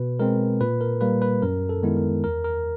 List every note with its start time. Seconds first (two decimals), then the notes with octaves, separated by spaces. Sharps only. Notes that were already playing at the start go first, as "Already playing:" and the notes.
Already playing: B2 B4
0.19 G#3 C4 A#4
0.61 A#2 B4
0.81 A#4
1.01 G3 A#3 B4
1.22 B4
1.42 F#2 A#4
1.69 A4
1.83 D#3 G#3 B3 E4
1.97 A#4
2.24 E2 A#4
2.44 A#4